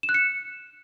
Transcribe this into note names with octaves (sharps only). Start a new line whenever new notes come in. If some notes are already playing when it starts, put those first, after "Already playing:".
E7
F#6
C#7